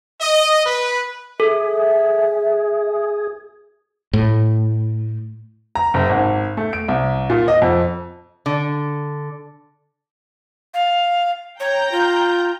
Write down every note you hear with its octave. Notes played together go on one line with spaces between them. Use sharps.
D#5
B4
G#4 A4 E5
A2
A#5
F#1
G#1
A3
D7
C2
A#2
D#5
F2
D3
F5
C#5 G5 A#5 G6
F4